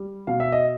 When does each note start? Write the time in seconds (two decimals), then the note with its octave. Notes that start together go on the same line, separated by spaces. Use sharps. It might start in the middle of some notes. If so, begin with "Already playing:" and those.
Already playing: G3
0.27 B2 F5
0.40 E5
0.52 D#5